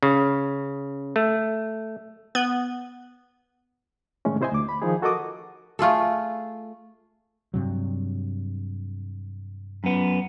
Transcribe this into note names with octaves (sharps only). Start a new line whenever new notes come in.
C#3
A3
B3
A2 C3 D#3 G#3 A3 C#4
C3 E4 C5 D#5 G#5
D2 D6
B5
D#3 F3 D#4 G#4
F#4 A4 A#4 D#5 D6 D#6
A3 F4 G#4 A4
G2 C3 F#3
F#2 B3